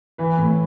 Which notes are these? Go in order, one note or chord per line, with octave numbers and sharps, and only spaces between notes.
E3 B4
A2